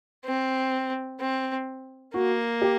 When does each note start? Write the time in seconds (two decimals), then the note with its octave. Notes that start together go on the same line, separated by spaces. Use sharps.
0.25 C4
1.20 C4
2.14 A#3 F#4
2.62 G4